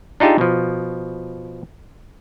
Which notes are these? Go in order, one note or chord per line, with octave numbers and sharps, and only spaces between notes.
D4 D#4 F4 G4 G#4 E5
B2 F3